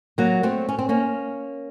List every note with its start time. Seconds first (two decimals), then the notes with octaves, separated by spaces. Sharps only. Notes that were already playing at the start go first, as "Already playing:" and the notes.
0.18 F#3 A#3
0.43 A3 C4
0.69 C#4
0.79 C4
0.89 A#3 C#4